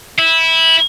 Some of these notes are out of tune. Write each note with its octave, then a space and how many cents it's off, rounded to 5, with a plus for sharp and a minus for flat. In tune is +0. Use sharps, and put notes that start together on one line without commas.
E4 -15